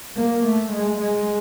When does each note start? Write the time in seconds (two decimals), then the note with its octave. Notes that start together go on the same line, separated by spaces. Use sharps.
0.16 A#3
0.44 A3
0.72 G#3
1.00 G#3